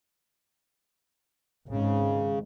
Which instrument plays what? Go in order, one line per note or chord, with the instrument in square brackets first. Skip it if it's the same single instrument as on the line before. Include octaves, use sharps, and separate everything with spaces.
[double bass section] G#1 G#2 [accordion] C#3